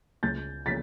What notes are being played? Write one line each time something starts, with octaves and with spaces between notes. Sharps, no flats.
C#2 G6 A6
C#3 F3 A6 B6